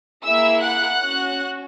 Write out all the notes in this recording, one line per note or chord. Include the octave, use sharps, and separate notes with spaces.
A#3 E4 G#4 E5 E6
F#5 F#6
C#4 F#4